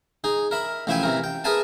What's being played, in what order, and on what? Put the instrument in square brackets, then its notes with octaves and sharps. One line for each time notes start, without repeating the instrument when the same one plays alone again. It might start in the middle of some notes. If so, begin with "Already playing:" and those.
[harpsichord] D#4 G#4
A#4 E5 B5
A1 F3 E4 E5 G5 G#5
C3 E3 A#4
G5
G#4 A#4 B4 E5 G#5 A5